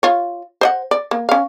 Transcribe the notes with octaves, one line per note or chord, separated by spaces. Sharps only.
F4 C#5
C5 D#5 F#5
D5
A#3
C#4 F5